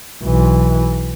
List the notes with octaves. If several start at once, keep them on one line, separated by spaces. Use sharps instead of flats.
B1 E3